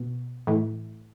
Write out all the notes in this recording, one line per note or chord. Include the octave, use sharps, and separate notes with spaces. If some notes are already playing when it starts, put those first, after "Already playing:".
Already playing: B2
A2 E3